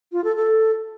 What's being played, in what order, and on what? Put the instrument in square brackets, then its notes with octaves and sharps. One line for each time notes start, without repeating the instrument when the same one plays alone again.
[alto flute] F4
A4
A4